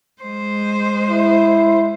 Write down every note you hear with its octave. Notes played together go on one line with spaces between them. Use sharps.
G#3 C5
E4